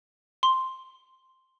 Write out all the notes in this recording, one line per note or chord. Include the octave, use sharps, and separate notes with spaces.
C6